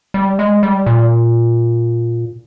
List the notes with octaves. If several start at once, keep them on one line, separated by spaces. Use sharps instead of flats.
G3
G#3
G3
A#2